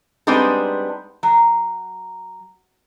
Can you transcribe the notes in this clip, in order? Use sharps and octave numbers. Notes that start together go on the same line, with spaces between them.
G3 G#3 B3 C4 D4 D#4
F#3